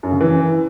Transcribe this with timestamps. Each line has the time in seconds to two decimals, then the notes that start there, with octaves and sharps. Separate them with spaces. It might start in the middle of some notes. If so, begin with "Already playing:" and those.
0.03 F#2
0.12 C#3
0.21 E3